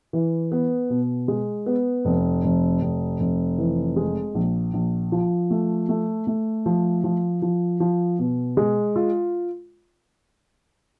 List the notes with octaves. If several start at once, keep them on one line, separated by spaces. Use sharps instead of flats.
E3
B3
B2
G#3
B3
F1
F1
F1
F1
E3
G#3
A#1
A#1
F3
A3
A3
A3
F3
F3
F3
F3
B2
G#3
F4